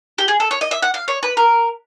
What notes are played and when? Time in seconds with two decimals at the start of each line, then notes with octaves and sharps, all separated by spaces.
0.18 G4
0.28 G#4
0.40 A4
0.51 C#5
0.61 D#5
0.71 E5
0.82 F#5
0.94 F5
1.08 C#5
1.23 B4
1.37 A#4